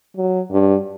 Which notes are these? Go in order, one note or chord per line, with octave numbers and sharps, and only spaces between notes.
F#3
G2